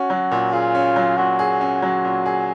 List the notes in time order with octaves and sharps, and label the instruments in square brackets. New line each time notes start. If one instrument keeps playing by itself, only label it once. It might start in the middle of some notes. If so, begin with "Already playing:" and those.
Already playing: [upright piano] C#4 [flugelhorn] F#4
[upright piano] F#3
A#2
[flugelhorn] F4 [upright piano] G#4
[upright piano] C#4
F#3
[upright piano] A#2 [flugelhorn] F#4
[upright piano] G#4
C#4
F#3
A#2
G#4